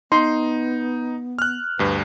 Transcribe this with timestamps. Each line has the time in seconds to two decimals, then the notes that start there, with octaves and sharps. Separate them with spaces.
0.12 B3 D#4 C6
1.39 F6 F#6
1.79 D2 G2 B4